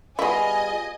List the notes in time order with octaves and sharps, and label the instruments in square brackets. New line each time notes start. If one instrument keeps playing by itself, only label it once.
[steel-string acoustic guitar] G3 F4 G#4 [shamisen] B3 E4 [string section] D#5 G#5